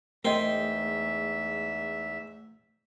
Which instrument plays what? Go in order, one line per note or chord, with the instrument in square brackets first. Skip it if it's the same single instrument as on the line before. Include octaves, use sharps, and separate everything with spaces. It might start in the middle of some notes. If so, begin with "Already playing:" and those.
[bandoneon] E2 G#2 E5 [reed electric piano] A3 [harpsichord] C4 C6 [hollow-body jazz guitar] A#4 D#5